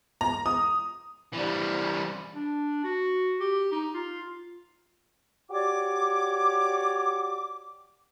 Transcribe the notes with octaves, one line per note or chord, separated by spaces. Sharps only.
A#5
D#6
E3 G3
D4
F#4
G4
D#4
F4
F#4 G4 C#5 D5 D6